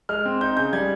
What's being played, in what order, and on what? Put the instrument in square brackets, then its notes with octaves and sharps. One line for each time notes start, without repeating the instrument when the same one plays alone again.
[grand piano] G#3 F6
C4
D#4 G6
C#3 G6
G3 G#6